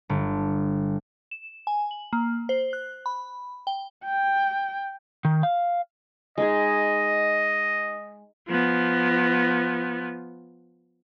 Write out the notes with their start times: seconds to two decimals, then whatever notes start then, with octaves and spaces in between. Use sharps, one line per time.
0.09 G1
1.31 E7
1.67 G#5
1.91 F#7
2.13 A#3
2.49 C5
2.73 F#6
3.06 B5
3.67 G5
4.05 G5
5.25 D#3
5.43 F5
6.38 G#3 D#4 G#4 D#5
8.48 F3 B3